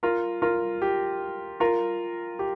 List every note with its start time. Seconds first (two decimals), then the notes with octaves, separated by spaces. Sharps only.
0.03 F4 A#4
0.42 F4 A#4
0.82 G4
1.60 F4 A#4
2.39 G4